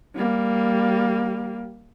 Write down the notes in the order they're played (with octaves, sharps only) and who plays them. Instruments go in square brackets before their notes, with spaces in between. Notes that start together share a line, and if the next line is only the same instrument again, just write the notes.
[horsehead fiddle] G3 A#3